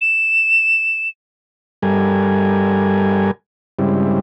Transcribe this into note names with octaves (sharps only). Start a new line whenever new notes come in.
E7
G2 G3 A4 A#4 G#5
G2 C#3 G3 G#3 C4 E4